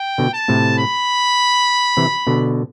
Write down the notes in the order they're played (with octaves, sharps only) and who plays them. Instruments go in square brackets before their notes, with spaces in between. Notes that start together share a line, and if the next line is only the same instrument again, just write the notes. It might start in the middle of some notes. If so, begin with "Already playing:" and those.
Already playing: [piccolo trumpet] G5
[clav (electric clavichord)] B2 D3
[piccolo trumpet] A5
[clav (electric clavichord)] A2 C3
[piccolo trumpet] B5
[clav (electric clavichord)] C3 E3
B2 D3